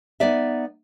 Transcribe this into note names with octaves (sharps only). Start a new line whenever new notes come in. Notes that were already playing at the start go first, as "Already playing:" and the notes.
B3 D#4 D5 E5